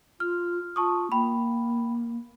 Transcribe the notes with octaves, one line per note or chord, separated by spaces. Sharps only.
F4 F6
F4 A5 C#6 D#6
A#3 G5 B5